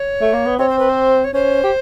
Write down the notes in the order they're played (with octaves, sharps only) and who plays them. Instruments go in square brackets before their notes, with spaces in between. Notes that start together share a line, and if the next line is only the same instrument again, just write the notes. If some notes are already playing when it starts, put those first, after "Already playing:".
Already playing: [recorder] C#5
[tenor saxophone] A3
A#3
B3
[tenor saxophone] C4 [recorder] C#5
[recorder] C5
B4
C5
C#5
[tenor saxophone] C#4 [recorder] C5
[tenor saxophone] G4